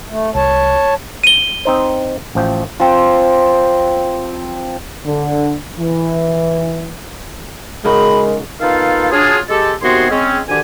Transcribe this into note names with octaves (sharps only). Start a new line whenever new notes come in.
A3
C2 C#5 A5
D#7 G7
C4 D#4 C5
A1 F3 G5
F3 C4
D3
E3
C#3 G#3 D#4 F#4 A#4 B5
D#3 B3 D#4 F4 A4 F5
F#3 D4 F4 G#4
G#3 G4 A4
D#2 C3 B3 F#4 G#4 C6
G#3 C4 C#4
D2 D3 D#3 G4 G#5